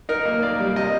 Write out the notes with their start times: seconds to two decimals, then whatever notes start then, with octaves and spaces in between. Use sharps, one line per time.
0.09 D#4 A#4
0.25 A#3
0.43 A#3 D5
0.60 G3
0.76 C3 D#5